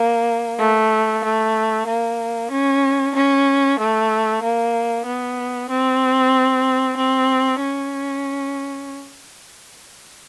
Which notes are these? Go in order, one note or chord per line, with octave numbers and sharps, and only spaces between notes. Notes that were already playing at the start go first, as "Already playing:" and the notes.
Already playing: A#3
A3
A3
A#3
C#4
C#4
A3
A#3
B3
C4
C4
C#4